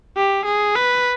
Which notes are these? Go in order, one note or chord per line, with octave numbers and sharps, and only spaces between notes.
G4
G#4
B4